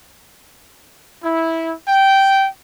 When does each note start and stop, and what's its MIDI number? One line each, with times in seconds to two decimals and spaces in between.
1.23 1.72 64
1.88 2.47 79